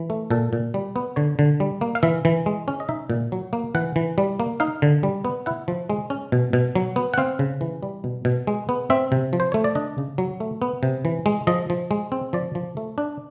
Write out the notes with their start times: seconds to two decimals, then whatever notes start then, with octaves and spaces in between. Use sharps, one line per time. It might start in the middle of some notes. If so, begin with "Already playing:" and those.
Already playing: E3
0.10 A3
0.30 A#2 A4
0.53 A#2
0.74 G3
0.96 B3
1.16 D3 C#5
1.39 D3
1.60 G3
1.81 A#3
1.95 F5
2.03 E3 E5
2.25 E3
2.46 G#3
2.68 C#4
2.80 D#5
2.89 D#4 E5
3.10 A#2
3.32 F#3
3.53 A#3
3.75 E3 F#5
3.96 E3
4.18 G3
4.40 A#3
4.60 D#4 F5
4.82 D3
5.03 G3
5.25 B3
5.46 E4 F#5
5.68 F3
5.90 G#3
6.10 C#4
6.32 B2
6.53 B2
6.75 F#3
6.96 B3
7.14 F#5
7.18 C4 F5
7.39 C#3
7.61 E3
7.83 G3
8.04 B2
8.25 B2
8.47 G#3
8.69 B3
8.90 C4 E5
9.12 C3
9.33 F3
9.40 C5
9.52 A3 C#5
9.64 D5
9.75 D4 D#5
9.98 C#3
10.18 F#3
10.40 A3
10.62 B3
10.83 C3
11.05 E3
11.26 G#3
11.47 F3 D#5
11.70 F3
11.91 G#3
12.12 C4
12.33 F3 D5
12.55 F3
12.77 A3
12.98 D4